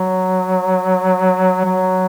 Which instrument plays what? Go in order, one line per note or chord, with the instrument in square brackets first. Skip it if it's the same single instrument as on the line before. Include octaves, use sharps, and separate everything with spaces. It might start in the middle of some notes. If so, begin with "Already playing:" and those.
Already playing: [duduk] F#3
F#3